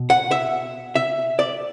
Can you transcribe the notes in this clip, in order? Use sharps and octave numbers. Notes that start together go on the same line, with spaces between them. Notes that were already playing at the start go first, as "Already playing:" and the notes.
Already playing: B2
F#5
E5
E5
D5